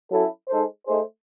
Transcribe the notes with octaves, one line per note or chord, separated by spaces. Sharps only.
F#3 C#4 E4 A4
G#3 D#4 A4 C5
A3 D#4 G#4 C5